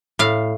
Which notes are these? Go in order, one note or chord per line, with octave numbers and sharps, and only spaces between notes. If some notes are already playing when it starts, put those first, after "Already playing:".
A2 F5